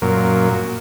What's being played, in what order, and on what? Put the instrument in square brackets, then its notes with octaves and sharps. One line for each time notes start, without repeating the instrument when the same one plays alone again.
[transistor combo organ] F#2 A#2